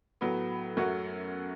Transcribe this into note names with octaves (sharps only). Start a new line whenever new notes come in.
A2 F#3 B3
F#2 F#3 A3 C#4 F#4